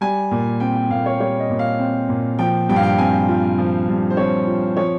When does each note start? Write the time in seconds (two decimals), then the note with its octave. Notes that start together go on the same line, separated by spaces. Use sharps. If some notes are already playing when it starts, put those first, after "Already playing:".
0.01 G3 G#5
0.31 A#2
0.60 C4 G5
0.75 G5
0.90 A#2 F5
1.06 C#5
1.20 G3 C#5
1.40 D#5
1.50 A#2
1.59 F5
1.79 C4
2.09 A#2
2.39 F3 G5
2.69 G2 G5
2.76 F5
2.83 G5
2.98 C4 G#5
3.28 F4
3.58 F3
3.88 G2
4.10 C5
4.17 C4 C#5
4.47 F4
4.77 F3 C#5